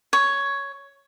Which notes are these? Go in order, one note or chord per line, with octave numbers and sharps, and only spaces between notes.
C#5